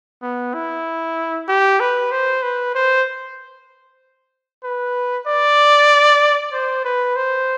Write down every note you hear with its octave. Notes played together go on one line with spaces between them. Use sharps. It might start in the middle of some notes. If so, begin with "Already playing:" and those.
B3
E4
G4
B4
C5
B4
C5
B4
D5
C5
B4
C5